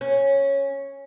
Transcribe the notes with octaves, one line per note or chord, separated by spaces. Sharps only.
C#4